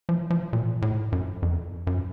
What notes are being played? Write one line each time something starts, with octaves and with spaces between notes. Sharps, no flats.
F3
F3
A#2
A2
F#2
F2
F#2